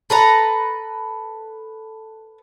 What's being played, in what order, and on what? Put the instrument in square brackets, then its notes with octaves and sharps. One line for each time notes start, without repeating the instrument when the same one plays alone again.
[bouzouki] A4 B4 A#5